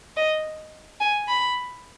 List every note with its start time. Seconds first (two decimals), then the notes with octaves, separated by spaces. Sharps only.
0.17 D#5
1.00 G#5
1.28 B5